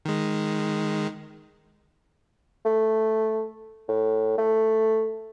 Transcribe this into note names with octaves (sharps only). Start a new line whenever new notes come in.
D#3 G#3
A3
A2
A3